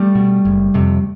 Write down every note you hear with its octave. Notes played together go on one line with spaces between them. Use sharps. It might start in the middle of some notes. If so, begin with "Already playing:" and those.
Already playing: G3 A3
B2
F#1
F2 C3